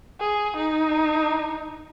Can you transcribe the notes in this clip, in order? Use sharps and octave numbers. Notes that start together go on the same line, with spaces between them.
G#4
D#4